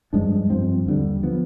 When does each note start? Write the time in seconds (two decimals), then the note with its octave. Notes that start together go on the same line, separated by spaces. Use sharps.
0.13 G2 F3 G#3 D4
0.50 G2 F3 C4
0.85 D#2 D3 G3
1.23 F3 B3